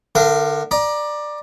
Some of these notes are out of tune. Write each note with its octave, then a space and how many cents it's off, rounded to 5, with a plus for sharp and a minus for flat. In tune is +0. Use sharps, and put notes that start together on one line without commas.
D3 +25 A#4 +0 F5 -40
D5 +15 A#5 +25